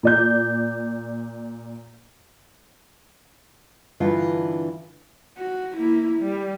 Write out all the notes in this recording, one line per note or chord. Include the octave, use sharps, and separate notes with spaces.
A#2 D5 G6
G2 D3 E3 D#4 F4
F#4
A#3 E4
G3